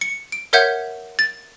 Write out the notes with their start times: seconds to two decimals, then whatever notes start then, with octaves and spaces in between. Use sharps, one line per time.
0.01 C#7
0.32 D7
0.53 A#4 C#5 E5 F#5 G6 G#6
1.19 A6